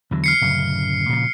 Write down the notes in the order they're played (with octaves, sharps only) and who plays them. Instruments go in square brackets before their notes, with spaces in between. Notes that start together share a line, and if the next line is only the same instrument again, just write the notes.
[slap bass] E2 D3 F#3
[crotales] F6 C7 C#7
[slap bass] D1 F#2 C#3
A#2 C#3 F3